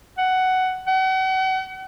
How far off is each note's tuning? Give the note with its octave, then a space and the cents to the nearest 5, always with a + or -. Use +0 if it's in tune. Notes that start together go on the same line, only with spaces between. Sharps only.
F#5 +10
F#5 +40